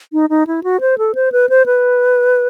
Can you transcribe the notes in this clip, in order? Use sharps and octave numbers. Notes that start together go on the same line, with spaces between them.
D#4
D#4
E4
F#4
C5
A4
C5
B4
C5
B4